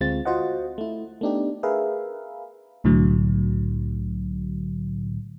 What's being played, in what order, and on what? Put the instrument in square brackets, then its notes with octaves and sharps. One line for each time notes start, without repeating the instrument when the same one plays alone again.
[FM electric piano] D2 G#3 C4 F4 A6
F4 F#4 C5 D#5 F#5
A3 E4
A3 B3 D4 D#4 G4
G#4 A#4 B4 E5 F5
C2 A2 D3 F#3